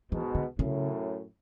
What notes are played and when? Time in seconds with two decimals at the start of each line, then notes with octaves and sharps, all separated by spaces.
0.12 G#2 B2 E3
0.35 D3
0.58 F#2 A2 C#3